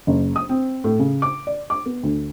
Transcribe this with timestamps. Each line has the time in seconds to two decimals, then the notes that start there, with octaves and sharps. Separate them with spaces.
0.07 F#1
0.36 D#6
0.49 C4
0.84 A2
1.00 C#3
1.22 D6
1.47 D5
1.70 D6
1.86 B3
2.03 D2